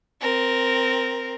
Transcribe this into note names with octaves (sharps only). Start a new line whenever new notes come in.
C4 A#4